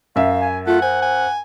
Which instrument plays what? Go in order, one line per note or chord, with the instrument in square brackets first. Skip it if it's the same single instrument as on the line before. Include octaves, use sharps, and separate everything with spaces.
[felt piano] F#2 E5 [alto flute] F5
[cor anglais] G#5
[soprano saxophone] A3 [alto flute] F4 [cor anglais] F#5
[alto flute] C5 [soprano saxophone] G#5
[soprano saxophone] G#5